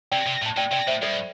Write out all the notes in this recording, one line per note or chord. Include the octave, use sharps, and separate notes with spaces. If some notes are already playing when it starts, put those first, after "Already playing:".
C3 D5 G5
C3
A2
A5
A2 D5 G5
C3 D5 G5
A2 C5 E5
G2 A4 D5